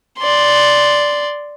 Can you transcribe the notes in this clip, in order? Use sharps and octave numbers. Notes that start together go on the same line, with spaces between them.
D5 C6